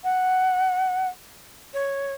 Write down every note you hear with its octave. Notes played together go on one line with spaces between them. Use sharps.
F#5
C#5